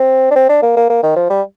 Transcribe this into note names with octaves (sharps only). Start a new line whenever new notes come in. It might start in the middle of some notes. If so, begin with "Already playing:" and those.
Already playing: C4
D4
C4
D4
A#3
A#3
A#3
D#3
F3
G3